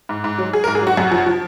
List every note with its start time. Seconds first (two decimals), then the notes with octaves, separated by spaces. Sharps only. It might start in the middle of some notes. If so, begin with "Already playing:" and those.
0.09 G#2
0.24 G#2
0.38 F#3
0.53 F#3 G#4
0.64 A#4
0.68 G#2
0.75 G#4
0.82 F#3 F#4
0.97 F#2
1.11 F3
1.26 F3